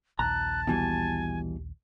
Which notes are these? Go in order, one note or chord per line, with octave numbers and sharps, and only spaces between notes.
A#1 D#2 A5 A#5 F#6
B2 E3 G3 G#5